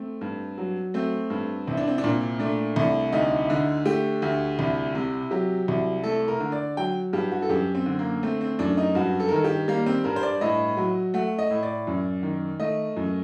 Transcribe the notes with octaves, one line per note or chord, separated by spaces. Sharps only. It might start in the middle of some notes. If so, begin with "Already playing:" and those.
Already playing: A3 C4
G2
F#3
A3 C4
G2
C2 C4
D4
C4
D4
A#2 C4
A3 D4
C2
D2 D#4
D3
A3 G4
D2
C2
C3
F#3 G4
C2
A3 A4
A#4
D3
D5
F#3 G5
G2 G4
F#4
A4
F#2 G4
C4
D3
A#3
A3 C4
C4
F#2 D4
D#4
G2 F#4
A4
A#4
D#3 A4
G4
G3 A#3
C4
G2 A#4
C5
D5
A2 D#5
F#3
A3 F#5
D#5
A2
D5
F#2
D#3
A3 D#5
F#2